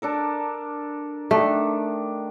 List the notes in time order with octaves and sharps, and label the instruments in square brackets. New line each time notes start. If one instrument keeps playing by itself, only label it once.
[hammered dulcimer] D4 A4 A#4
[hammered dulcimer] D#3 D4 [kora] A3